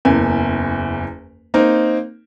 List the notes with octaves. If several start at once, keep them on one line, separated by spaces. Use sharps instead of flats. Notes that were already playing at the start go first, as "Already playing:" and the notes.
F#1 E2 G#5
A#3 C4 D#4